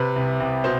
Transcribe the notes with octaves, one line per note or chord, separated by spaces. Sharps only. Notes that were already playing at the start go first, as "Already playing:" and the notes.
Already playing: C3 B4
C2
C2
B2 C5